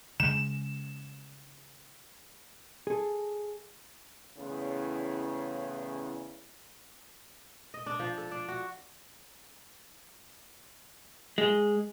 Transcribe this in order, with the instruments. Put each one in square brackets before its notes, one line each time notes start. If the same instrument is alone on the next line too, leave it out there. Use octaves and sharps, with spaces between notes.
[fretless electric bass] C#3 G#3 [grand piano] E7
[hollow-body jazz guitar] G#4 A4
[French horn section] E2 A2 C#3
[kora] D#5
D4
F3
A4
D4
F#4
[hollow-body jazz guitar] G#3